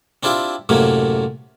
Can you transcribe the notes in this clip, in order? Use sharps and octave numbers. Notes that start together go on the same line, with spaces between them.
C4 D4 E4 F4 G4
F#2 A2 C3 A#3